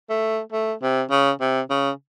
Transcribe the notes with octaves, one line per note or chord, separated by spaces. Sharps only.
A3
A3
C3
C#3
C3
C#3